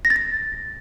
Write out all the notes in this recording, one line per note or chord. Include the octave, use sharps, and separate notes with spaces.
A#6
A6
A#6